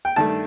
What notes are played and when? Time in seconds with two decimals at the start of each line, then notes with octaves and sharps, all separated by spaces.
0.05 G5
0.16 G2 D#3 A3 A5